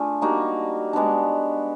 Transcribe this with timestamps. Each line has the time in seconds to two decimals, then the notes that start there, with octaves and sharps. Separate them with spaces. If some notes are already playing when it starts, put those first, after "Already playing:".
Already playing: A3 D4 F4 G#4
0.21 G3 A#3 D#4 F#4
0.93 G#3 B3 D4